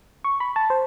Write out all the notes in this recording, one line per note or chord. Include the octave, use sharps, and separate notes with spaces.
C#6
B5
A5
C5